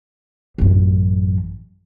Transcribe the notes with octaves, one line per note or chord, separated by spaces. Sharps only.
A1 F#2